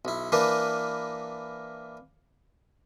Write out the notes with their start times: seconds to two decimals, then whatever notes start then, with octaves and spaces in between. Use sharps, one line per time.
0.05 B1 E4
0.32 E3 A#3 D4 A#4 B4